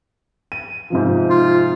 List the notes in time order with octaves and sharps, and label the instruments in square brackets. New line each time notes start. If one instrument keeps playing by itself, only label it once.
[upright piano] D#7
G#2 C3 F3
[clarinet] F4